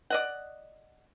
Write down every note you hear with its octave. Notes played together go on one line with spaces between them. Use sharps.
D5 D#5 F#5